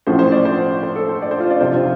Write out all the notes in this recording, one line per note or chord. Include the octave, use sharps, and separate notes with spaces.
A1 A2 F3 C5
C5
D5
C5
C5
A4
C5
D5
C5
F4
D5
F1 F2 C3 C5
F4